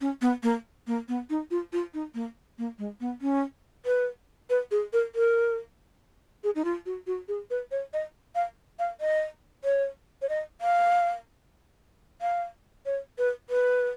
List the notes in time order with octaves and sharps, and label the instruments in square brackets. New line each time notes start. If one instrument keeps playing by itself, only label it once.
[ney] C#4
B3
A#3
A#3
B3
D#4
F4
F4
D#4
A#3
A#3
G#3
B3
C#4
B4
B4
G#4
A#4
A#4
G#4
D#4
F4
F#4
F#4
G#4
B4
C#5
D#5
F5
F5
D#5
C#5
C#5
D#5
F5
F5
C#5
B4
B4